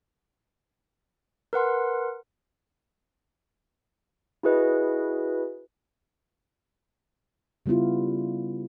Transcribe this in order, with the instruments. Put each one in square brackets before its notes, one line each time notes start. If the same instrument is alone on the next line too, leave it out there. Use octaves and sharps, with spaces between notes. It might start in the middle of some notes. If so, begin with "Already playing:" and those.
[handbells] A#4 B4 F#5 C6
E4 F#4 G#4 B4 D#5
[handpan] C#3 G3 B3 E4 F4